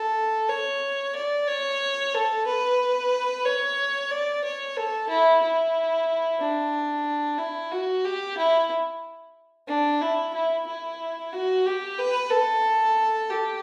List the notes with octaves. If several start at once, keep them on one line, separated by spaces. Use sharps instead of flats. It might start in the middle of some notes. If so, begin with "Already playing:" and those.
Already playing: A4
C#5
D5
C#5
A4
B4
C#5
D5
C#5
A4
E4
E4
D4
E4
F#4
G4
E4
D4
E4
E4
E4
F#4
G4
B4
A4
G4